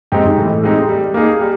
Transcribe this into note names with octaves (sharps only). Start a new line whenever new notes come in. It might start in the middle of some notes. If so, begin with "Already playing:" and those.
G#2 G#3 C4 D#4 G4
G#2
A2 E3
G#3 C4 D#4 G4
G3
A#3 D#4 G#4
G3